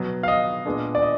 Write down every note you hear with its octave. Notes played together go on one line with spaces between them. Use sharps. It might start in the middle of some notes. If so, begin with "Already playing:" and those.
Already playing: B2 F#3 B3
F5
D#5
A#2 G#3 B3 D4
D5
D#5